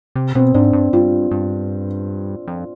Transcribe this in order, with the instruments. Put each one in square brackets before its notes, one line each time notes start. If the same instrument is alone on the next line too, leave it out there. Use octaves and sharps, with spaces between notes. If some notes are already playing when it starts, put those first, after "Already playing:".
[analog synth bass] C3
[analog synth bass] B2 [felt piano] C4
[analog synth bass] G#2 [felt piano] D4
[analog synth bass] G2
[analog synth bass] G2 [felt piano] F4
[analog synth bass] G2
F2